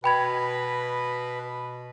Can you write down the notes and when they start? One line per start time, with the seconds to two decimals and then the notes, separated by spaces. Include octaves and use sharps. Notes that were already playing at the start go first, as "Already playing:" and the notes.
0.04 B2 B4 G5 B5 G#6